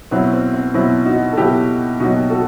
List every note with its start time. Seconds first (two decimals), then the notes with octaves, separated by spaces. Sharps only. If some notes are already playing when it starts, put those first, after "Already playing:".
0.11 B2 F#3 C4 E4
0.33 C4
0.54 C4
0.74 B2 F#3 C4 E4
1.05 D#4 F#4
1.33 A4
1.36 B2 F#3 E4 G4
2.00 B2 F#3 D#4 F#4
2.30 F#4 A4